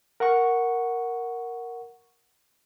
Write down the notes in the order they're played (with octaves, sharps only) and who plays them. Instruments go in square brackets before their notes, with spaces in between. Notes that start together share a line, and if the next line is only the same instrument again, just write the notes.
[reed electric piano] A#4 F#5 A#5 C#6